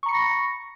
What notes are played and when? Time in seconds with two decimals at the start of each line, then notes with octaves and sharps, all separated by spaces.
0.03 C#6
0.06 A#5
0.09 C#7
0.11 B5
0.14 A#6